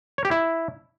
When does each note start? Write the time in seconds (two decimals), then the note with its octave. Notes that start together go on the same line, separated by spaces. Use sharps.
0.18 C#5
0.25 G4
0.31 E4